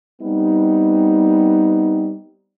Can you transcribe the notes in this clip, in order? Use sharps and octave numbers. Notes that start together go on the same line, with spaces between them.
G3 B3 C4 D#4